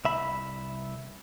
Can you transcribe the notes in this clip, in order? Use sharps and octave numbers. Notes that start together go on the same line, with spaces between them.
C2 E5 B5